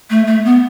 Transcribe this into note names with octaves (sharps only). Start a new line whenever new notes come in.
A3
A3
B3